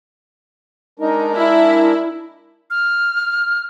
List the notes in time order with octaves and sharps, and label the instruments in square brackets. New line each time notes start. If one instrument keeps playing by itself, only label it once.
[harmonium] G#3 D4 A#4 [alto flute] D#4
[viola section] E4 [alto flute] E5
[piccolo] F6